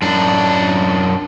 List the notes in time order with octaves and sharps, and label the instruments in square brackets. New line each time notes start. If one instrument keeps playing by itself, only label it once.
[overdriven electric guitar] F#2 D4